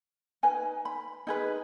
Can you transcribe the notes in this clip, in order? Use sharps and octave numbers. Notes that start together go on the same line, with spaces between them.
D#4 B4 G#5
B5
D#4 G#4 B4